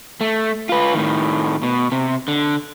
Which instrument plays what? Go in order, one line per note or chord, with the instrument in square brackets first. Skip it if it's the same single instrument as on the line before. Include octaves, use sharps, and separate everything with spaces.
[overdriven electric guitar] A3
F4 B4
A2 D#3
B2
C3
D3